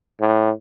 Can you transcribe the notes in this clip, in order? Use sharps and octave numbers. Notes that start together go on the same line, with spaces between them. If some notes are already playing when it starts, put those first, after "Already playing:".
A2